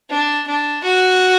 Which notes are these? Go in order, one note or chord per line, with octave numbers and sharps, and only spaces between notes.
D4
D4
F#4